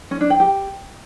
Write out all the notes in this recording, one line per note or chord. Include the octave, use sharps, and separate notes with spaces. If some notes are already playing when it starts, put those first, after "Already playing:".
C#4
D4
G5
G4